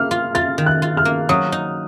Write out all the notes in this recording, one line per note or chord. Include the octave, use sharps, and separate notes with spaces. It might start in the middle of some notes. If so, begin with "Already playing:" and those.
Already playing: A#3 F6
F4
F4 A6
D#3
F#6
F4
F6
A#3
F#3 D#6
D#4